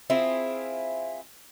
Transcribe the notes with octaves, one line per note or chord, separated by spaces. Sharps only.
C4 E4 F4 G#4